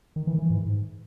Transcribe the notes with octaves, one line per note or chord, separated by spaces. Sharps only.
D#3
E3
E3
G#2